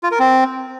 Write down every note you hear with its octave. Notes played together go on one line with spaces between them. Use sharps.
F4
A#4
C4